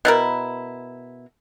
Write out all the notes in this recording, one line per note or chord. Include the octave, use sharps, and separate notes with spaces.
B2 E4 A#4